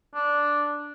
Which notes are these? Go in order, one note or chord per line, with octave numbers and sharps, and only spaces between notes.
D4